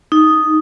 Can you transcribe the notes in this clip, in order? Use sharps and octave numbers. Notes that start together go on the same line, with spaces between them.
D#4